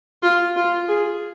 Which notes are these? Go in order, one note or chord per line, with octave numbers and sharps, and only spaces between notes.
F4
F4
G#4